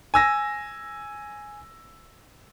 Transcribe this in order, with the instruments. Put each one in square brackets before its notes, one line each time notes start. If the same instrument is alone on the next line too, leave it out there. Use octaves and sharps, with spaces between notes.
[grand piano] G#5 E6 A#6